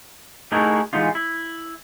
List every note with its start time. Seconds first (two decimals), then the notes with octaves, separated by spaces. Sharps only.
0.52 A3 D#4 E4 F#4 G#4 A#4
0.93 E3 F3 G#3 B3 D#4 F4
1.15 E4